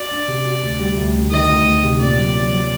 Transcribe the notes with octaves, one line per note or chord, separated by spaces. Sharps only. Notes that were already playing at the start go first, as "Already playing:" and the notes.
Already playing: F#4 D5
D4
C3
F#4
D2
G3
D2
D2
D#3 D#5
D2
D2
C3
A#2 D5
F#3
F#3
F#3